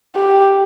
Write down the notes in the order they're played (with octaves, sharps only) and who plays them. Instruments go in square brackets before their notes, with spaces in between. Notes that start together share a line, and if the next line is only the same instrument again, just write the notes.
[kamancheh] G4